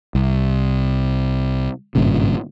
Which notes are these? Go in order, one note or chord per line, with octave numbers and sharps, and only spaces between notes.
C2
G#1 G2 A#2 C#3